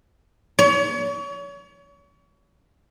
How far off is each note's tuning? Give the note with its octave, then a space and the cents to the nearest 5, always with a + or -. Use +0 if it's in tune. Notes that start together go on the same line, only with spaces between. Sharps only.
C#5 +35